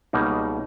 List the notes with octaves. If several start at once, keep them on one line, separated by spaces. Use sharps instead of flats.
C#2 B2 G3 A#3 D#4